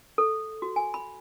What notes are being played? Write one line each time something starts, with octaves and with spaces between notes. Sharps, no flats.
A4
F#4
G#5
B5